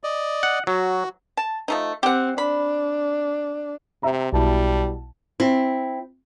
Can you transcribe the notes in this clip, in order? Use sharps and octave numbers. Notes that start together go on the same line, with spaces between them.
D5 D#5
F#5
F#3 F#4
A5
F3 A3 D#4
C4 G4 F#5
D4 B5
C3 E5 A#5
B1 B2 G3 E4 G5 A5
C4 E4